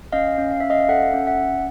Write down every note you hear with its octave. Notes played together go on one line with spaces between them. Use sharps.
C#4 D#5 F5
C#4
F5
C#4 E5
D#5 F5
F5
A4 E5 F#5
C#4
E5 F#5
C#4